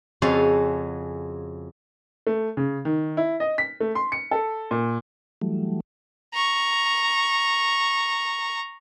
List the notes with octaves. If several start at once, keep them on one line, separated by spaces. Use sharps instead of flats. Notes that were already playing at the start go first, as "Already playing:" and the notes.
F2 C#3 F#4 G#4 A4 F5
A3
C#3
D#3
E4
D#5
B6
A3
C6
C#7
A4
A#2
E3 F#3 G3 A3
A#5 C#6